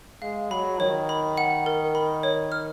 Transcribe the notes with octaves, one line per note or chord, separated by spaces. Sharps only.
G#3 F5
F#3 B5
D#3 C#5
B5
F#5
A#4
B5
C#5
F6